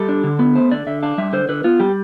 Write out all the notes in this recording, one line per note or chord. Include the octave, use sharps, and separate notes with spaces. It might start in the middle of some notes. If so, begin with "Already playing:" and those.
Already playing: G3 A4
D4
D3
B3
A3 C5
D3 D5
D3 E5
D4 F5
G3 E5
D3 C5
D3 B4
B3 F4
G3 G4